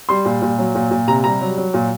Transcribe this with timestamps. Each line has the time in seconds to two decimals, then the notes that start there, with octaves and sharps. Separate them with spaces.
0.09 G3 C6
0.25 A#2
0.42 A#2
0.58 F#3
0.75 A#2
0.91 A#2
1.08 C3 A#5
1.24 G3 A#5
1.41 F#3
1.58 F#3
1.74 A#2